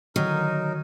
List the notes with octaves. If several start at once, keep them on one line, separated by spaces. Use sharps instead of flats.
D3 D#3 F#3 D#4 A#4 D#7